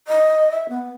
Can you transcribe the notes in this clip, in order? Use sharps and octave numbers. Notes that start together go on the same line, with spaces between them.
D#5
E5
B3